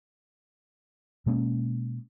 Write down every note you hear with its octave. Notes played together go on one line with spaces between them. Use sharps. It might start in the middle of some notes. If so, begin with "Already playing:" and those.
B2 G#3 A#3 C#4